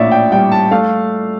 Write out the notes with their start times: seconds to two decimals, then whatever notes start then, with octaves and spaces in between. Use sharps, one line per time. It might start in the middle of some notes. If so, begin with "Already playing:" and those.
Already playing: A#1 A2 C#5 D5 E5
0.11 G5
0.32 G3 G5
0.52 A5
0.71 A3 F5